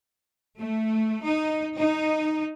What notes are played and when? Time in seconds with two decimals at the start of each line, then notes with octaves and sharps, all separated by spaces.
0.57 A3
1.23 D#4
1.78 D#4